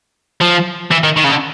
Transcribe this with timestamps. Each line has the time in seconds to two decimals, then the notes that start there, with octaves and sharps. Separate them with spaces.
0.41 F3
0.91 E3
1.04 D#3
1.16 D#3
1.24 C#3
1.29 D3